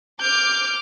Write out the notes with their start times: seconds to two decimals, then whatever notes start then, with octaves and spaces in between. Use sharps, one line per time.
0.21 D6 F6 G6